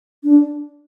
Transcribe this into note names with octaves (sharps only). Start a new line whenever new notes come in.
D4